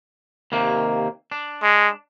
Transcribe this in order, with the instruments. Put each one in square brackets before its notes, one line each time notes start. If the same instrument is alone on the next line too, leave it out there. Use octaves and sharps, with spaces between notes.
[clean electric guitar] D#2 C3 A#3
D4
[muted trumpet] G#3